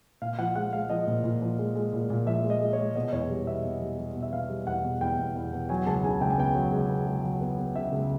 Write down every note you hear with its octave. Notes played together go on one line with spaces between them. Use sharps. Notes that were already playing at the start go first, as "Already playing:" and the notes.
A#2 F5
F3 F#5
G#3 F#5
G#3 F5
F3 D#5
A#2
A#2
F3
G#3
G#3
A#2
A#2
F3 E5
G#3
D#5
G#3
C#5
G#3
B2 D#5
E2 C#5
G3
B2 E5
B2
G3
G3
B2
E5
B2 F5
G3
E2 F#5
B2
E2 G5
E2
E2
B2
F#3 G#5
C#2 A5
C#3 G#5
C#2 G5
G#5
B3 G5
F#3
C#2
B3
C#2
F#3
B3
B3
C#3 E5
C#2